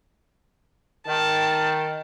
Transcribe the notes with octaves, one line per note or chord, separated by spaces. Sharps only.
D#3 A5